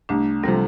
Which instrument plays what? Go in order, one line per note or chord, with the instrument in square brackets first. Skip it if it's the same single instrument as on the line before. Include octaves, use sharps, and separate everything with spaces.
[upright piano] C2 [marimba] A3 D4
[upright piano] C3 F3 A3 [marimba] G3 C4